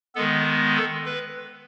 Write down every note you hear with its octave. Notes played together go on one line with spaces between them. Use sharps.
D#3 G#3 B3 A4
A4
B4